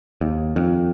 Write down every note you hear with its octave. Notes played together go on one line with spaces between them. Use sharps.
D#2
F2